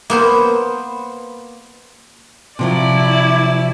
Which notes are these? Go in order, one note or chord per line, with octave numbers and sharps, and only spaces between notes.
A#3 B3 C5
C3 F3 F#3 E4 D5